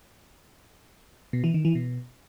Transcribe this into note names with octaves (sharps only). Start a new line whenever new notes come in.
B2
E3
D#3
E3
B2